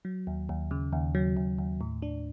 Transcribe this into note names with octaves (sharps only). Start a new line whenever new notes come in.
F#3
D#2
D#2
C#3
D#2
F#3
D#2
D#2
A2
D4